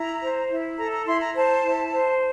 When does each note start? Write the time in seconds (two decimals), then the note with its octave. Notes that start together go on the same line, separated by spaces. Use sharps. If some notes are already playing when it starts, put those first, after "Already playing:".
Already playing: E4 A#5
0.21 C5
0.49 E4
0.78 A4 A#5
0.92 A#5
1.06 E4 C6
1.21 A#5
1.34 C5 A5
1.63 E4
1.92 C5